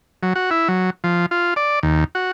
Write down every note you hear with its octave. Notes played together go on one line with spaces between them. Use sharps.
F#3
F#4
E4
F#3
F3
F4
D5
D#2
F#4